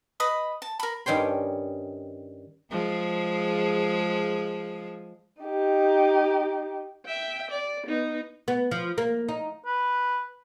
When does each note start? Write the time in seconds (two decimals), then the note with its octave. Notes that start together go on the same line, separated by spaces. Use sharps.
0.20 B4 D#5 B5 D#6
0.62 A5
0.80 A#4 B5
1.06 G2 D#3 C#4 G5 C6
2.71 F3 G#3 G#4
5.43 D#4 G4
7.06 E5 G5
7.51 D5
7.87 B3 D#4
8.48 B3
8.71 F3
8.98 A#3
9.29 D#4
9.66 B4